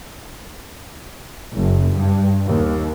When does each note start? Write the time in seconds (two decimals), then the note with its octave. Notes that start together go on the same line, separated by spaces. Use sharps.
1.56 F#1
1.95 G2
2.47 D#2